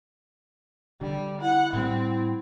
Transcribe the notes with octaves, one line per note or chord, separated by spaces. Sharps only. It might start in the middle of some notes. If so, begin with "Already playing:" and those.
D3 G3
E4 F#5
A2 G3 C4